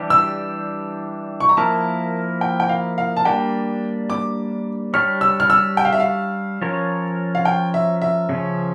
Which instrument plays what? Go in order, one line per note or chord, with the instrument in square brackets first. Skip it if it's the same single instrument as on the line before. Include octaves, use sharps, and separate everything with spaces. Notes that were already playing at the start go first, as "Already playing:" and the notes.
Already playing: [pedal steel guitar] E3 G3 D4 G4
[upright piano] E6
C#6
A#5
[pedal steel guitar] F3 A#3 E4 A#4 [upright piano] A5
[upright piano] G5
G5
F5
F5
A5
[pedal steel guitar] G3 A#3 D4 [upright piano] G5
[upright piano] D6
[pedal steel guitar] G3 D4 G4 C#5 [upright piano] F6
[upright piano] E6
F6
E6
G5
F5
E5
F5
[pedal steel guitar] F3 C#4 F4 A#4 C#5
[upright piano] F5
G5
E5
E5
[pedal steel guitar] C#3 F3 C#4